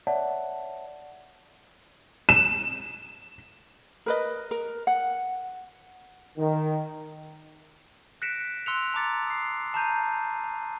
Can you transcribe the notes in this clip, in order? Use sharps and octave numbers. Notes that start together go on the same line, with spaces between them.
C#5 D5 E5 F#5 A5
E7
A#4 B4 D#5
A#4
F#5
D#3
F#6 A#6 B6 C#7 D7 E7
C6 E6 F#6 C#7 F7
A5 A#5 D6 A6 C#7
D#6 C7
A5 A#5 G6 D#7